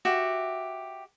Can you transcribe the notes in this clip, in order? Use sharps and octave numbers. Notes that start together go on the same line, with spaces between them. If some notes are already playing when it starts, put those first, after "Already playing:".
F#4 G4 E5